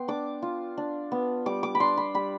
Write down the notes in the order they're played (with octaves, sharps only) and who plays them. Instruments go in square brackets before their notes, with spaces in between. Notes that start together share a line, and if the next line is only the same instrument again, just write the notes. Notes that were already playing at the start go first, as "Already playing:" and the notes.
Already playing: [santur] B3 G5 C6
D4 D6
F4
D4
B3
G3 D6
D6
B5
D4 C6
B5
G3 B5